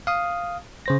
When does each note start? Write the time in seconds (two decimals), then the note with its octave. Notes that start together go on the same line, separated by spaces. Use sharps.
0.07 F5 D#6
0.86 C#3 C5 A#6